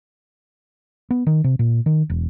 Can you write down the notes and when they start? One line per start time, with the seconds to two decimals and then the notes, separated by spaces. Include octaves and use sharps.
1.10 B3
1.27 D#3
1.44 C3
1.59 A#2
1.86 D#3
2.10 E1